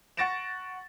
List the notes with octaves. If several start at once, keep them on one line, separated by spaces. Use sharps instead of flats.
F#5 C#6 A6 A#6 D7 E7